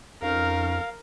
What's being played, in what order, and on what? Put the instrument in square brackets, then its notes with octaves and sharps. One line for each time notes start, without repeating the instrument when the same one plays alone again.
[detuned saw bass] F2 [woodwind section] C#4 D#4 [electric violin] A#4 [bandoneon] F5